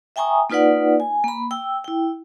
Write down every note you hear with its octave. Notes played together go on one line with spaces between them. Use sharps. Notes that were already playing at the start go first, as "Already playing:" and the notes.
E5 G5 G#5 A#5 C#6 D#6
A#3 D#4 F4 B4 D5 F#5
G#5
A#3 B5
G5 E6
E4 G5